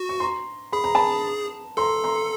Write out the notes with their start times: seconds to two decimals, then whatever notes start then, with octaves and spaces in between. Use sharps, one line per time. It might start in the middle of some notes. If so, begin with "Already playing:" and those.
Already playing: F#4
0.09 C#6
0.20 A#5 C6
0.73 G#4 B5
0.84 A#5
0.95 A5 B5
1.77 A4 A#5 C6
2.04 A#5 C6